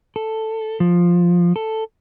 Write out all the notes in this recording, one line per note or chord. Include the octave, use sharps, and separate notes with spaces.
A4
F3
A4